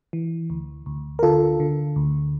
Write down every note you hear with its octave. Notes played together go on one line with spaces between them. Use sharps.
E3
D2
D2
A#4
D3 F4 A4
D3
D2